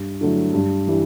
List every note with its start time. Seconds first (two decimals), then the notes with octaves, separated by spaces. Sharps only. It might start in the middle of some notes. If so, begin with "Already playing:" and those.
Already playing: G2
0.21 D3 F#3 A3 E4
0.54 G2
0.87 E3 G3